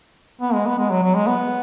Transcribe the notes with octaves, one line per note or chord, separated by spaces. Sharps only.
B3
G#3
B3
G#3
F#3
F#3
G#3
B3